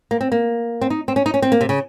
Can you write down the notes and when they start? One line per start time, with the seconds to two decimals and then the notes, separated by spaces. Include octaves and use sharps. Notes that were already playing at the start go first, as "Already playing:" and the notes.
0.11 A#3
0.21 C4
0.32 A#3
0.81 C4
0.90 D#4
1.08 C4
1.16 C#4
1.26 D#4
1.34 C#4
1.42 C4
1.52 A#3
1.61 C3
1.69 C#3